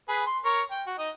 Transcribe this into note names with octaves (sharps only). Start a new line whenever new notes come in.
G#4 B4
C6
A#4 C#5 C#6
G5
F#4
D#4 D#5